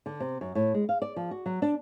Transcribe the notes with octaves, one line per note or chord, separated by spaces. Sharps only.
D3
C3
F#2
A2
G#3
F5
D5
F3
F#4
F#3
D4